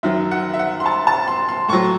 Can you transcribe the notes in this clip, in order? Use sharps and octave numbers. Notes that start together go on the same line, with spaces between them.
F#2 D#3 F#3 E5
F#5
E5
F#5
C6
A5
A5
C6
C6
A2 F#3 C#6